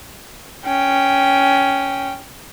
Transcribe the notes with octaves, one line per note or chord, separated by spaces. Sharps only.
C#4 G5